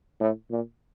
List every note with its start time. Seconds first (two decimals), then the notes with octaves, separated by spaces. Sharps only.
0.20 A2
0.50 A#2